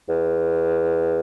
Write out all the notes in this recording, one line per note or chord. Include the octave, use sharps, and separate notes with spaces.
E2